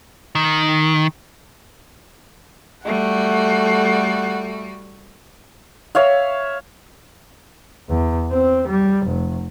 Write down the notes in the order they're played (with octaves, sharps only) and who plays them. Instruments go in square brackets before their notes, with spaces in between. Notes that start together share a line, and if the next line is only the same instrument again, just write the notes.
[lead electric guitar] D#3
[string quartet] G3 F#4 [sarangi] A3 [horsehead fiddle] F#5
[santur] C#5 E5 F5
[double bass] E2
C4
G3
F1